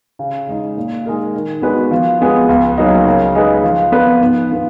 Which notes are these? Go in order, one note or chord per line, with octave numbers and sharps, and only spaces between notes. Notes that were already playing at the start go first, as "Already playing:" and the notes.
C#3
G#3 D#4
A#2
G#3 D#4 A#4
D#3
G#3 B3 F#4 B4
F3
G#3 B3 F4 G#4
C#2
C#3 F#3 A#3 D#4
C#3
G#3 D#4 G#4 B4
F3
B3 F4 B4
G#2
F3 B3